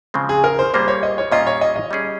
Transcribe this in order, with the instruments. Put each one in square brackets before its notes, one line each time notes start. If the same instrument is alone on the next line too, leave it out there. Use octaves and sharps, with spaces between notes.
[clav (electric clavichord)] C#3 F3 G#3 C4
[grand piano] G#4
A#4
C5
[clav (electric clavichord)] G3 A#3 F4 G#4 [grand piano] C5
[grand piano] C#5
D#5
C#5
[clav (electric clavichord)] A#2 G3 C#4 F4 [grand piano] D#5
[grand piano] C#5
D#5
D#5
[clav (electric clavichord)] G3 C#4 G#4